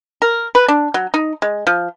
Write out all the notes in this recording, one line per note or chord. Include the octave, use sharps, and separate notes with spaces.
A#4
B4
D4
F#3
D#4
G#3
F3